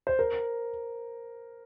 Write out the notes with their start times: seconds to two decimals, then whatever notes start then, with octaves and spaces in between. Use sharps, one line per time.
0.07 C5
0.19 A#4